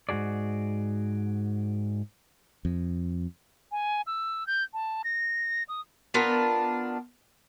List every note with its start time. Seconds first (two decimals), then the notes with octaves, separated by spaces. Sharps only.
0.09 G#2 D#3 F#4 G#4 D5
2.65 F2
3.72 G#5
4.07 E6
4.47 G6
4.74 A5
5.04 A#6
5.69 D#6
6.14 B3 D4 F4 A#4